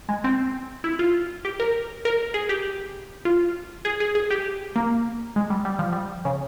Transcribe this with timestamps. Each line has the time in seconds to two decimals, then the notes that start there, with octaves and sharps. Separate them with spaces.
0.09 G#3
0.24 C4
0.84 E4
0.99 F4
1.45 G4
1.60 A#4
2.05 A#4
2.34 G#4
2.49 G4
3.25 F4
3.85 G#4
4.00 G#4
4.15 G#4
4.30 G4
4.76 A#3
5.36 G#3
5.50 G3
5.65 G3
5.79 F3
5.93 G3
6.25 C#3